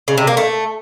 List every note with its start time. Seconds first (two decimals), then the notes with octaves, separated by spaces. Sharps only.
0.08 C#3
0.18 C3
0.27 A#3
0.37 A3